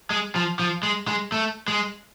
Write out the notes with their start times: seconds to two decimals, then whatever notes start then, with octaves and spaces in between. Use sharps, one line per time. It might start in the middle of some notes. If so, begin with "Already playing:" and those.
0.10 G#3
0.35 F3
0.59 F3
0.83 G#3
1.07 G#3
1.32 A3
1.68 G#3